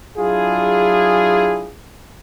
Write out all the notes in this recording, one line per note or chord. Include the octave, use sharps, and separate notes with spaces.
F#3 D4 E4 F4 G#4